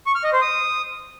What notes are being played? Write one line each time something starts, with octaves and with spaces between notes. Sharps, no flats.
C#6
F6
D#5
C5
D#6